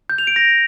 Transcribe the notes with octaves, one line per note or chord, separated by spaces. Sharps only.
G6
F7
D7
A#6